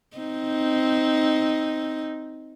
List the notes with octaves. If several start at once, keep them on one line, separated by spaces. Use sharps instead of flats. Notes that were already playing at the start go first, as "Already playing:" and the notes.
C4 D#4